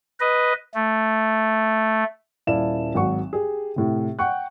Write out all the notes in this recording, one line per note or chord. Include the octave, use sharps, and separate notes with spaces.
B4 D#5
A3
D#1 E4 D5 F5 A5 E7
G#1 F#3 F#5 C#6
G4 G#4
A2 C3
F#5 G5 C#6 F#6